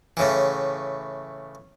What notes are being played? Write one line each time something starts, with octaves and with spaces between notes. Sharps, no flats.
A2 C#3 E3